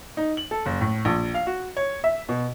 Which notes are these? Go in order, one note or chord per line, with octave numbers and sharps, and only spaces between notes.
D#4
F#7
A4
F#1
A2
A#1
F5
F#4
C#5
E5
B2